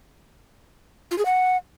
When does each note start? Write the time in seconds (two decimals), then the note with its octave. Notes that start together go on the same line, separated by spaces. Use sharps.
1.11 F4
1.18 G#4
1.25 F#5